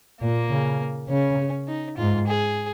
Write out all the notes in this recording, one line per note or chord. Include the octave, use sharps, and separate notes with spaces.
A#2 A#3
C#3
C#3 C#4
D#4
G#2 F4
G#4